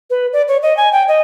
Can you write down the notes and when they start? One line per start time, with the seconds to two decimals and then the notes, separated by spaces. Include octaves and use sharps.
0.10 B4
0.33 D5
0.48 C#5
0.62 D#5
0.77 G#5
0.93 G5
1.08 D#5